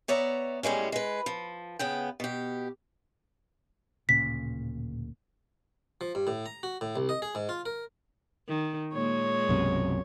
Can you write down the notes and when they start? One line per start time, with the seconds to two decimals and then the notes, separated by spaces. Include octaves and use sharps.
0.08 B3 C#5 D5 E5 A#5
0.63 A2 G3 G#3 C#4
0.92 G#3 B4
1.26 F3
1.79 C#3 B3 G5
2.20 B2 G4
4.09 D1 A#2 C#3 B6
6.01 F3
6.15 G2
6.27 A2
6.46 A#5
6.63 F#4
6.81 A2
6.96 C2
7.09 D#5
7.22 G#4
7.35 G#2
7.49 F4
7.66 A#4
8.48 D#3
8.93 A#2 G#3 A#3 C#5
9.49 B1 F#2 C3